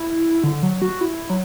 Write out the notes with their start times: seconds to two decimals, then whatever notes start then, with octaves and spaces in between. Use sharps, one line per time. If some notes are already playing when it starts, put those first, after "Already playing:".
Already playing: E4
0.44 D3
0.63 F#3
0.82 F#4
1.01 E4
1.30 F#3